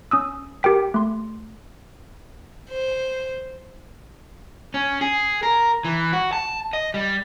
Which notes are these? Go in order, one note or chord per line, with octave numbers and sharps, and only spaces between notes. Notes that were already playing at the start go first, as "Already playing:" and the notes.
C#4 D#6 E6
G4 A#4 G5 B6
A3 C6
C5
C#4
G#4
A#4
E3
F#4
A5
D#5
G3